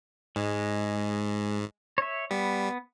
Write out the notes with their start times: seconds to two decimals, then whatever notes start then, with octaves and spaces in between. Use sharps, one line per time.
0.36 G#2 G#3
1.98 C#5 E5
2.31 G3 B3